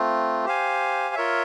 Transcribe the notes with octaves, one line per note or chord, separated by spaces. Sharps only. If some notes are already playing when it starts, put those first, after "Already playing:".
Already playing: A3 C4 F4
G4 C5 F5 G#5
F4 A#4 C#5 E5